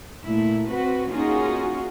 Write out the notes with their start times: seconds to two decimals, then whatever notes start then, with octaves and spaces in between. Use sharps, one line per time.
0.24 A#2 A3 E4
0.70 C4 F#4 B4
1.07 A#3 C#4 D#4 F4 F#4 G#4